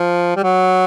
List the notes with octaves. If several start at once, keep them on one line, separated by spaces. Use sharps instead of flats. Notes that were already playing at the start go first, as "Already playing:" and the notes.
Already playing: F3
G3
F#3